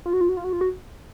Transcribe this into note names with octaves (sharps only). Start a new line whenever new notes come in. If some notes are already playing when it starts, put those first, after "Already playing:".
F4
F#4
F4
F#4
F4
F#4
F4
F#4